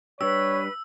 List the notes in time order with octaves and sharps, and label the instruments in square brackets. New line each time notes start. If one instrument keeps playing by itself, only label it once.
[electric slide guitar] G3 D4 G4 [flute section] B4 [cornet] C#5 [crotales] E6